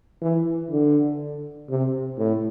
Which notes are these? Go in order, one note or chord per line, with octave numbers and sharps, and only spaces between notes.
E3
D3
C3
A2